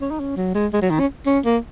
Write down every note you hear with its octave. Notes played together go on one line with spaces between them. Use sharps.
C#4
D#4
C#4
F#3
G#3
G#3
F#3
D#3
C#4
C#4
A#3